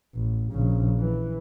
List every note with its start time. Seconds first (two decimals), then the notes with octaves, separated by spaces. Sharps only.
0.15 A1
0.51 A#1 C#3
0.99 E3